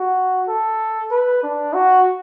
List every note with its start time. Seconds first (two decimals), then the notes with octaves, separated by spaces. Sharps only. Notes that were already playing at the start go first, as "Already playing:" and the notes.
Already playing: F#4
0.48 A4
1.11 B4
1.43 D4
1.74 F#4